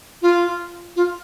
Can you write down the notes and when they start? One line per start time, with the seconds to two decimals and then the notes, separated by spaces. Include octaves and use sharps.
0.22 F4
0.96 F4